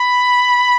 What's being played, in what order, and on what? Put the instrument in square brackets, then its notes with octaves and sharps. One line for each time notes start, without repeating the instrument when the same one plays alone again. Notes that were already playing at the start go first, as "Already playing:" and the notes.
Already playing: [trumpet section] B5